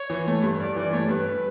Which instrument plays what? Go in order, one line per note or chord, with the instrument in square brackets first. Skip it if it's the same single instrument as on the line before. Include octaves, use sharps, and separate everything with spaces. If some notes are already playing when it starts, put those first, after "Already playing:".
Already playing: [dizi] C#5
[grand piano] E3
A3
G2
[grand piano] G2 [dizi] D5
[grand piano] E3 [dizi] D5
[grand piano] A3 [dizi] C#5
[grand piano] G2 [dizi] B4